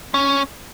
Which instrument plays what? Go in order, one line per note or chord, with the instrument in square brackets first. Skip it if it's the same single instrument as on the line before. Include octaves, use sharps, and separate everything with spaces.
[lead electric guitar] C#4